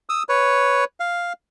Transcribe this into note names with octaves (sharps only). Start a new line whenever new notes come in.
D#6 E6
B4 C#5
F5